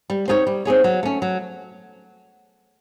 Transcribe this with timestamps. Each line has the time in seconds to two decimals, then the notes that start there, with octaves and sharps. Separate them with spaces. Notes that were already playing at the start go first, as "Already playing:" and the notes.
0.10 G3
0.28 C4 D#4 G#4 C#5
0.47 G3
0.65 C4 D#4 G#4 C#5
0.84 F#3
1.03 A3 C#4
1.22 F#3